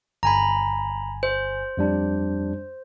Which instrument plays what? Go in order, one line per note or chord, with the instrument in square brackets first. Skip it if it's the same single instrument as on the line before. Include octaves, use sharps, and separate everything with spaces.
[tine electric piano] G1 G#5 [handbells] A#5 B5
[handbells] C5
[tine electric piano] F2 G3 D4